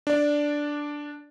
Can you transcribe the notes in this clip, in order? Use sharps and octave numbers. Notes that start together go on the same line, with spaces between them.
D4 D5